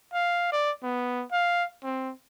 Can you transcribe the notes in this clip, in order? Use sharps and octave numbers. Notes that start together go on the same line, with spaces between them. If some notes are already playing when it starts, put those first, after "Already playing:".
F5
D5
B3
F5
C4